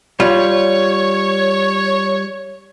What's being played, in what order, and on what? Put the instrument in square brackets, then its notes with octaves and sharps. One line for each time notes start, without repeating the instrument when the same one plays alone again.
[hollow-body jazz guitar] G3 F4 [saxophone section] C#5